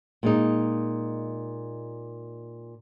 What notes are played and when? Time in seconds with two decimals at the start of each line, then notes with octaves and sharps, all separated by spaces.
0.23 A#2 G#3 D#4